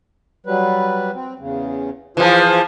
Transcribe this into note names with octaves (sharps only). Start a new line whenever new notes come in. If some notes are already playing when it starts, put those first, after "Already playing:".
F#3 G3 B4
C4
E2 C#3
E3 F3 F4 G#4 C5